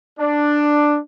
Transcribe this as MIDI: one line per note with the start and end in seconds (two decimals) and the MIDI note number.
0.19 0.99 62